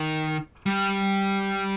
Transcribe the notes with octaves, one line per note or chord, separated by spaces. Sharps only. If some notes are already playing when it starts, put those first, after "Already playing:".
Already playing: D#3
G3